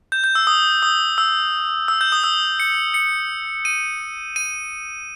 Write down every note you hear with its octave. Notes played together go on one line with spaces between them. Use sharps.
G6
G6
E6
D#6
D#6
E6
E6
G6
D#6
E6
C#7
C#7
D#7
D#7